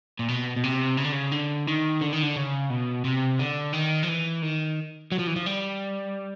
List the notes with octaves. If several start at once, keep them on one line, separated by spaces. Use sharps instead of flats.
A#2
B2
B2
C3
C#3
D3
C#3
D3
D#3
D3
D#3
D3
C#3
B2
C3
D3
D#3
F3
E3
D#3
F#3
F3
E3
F3
G3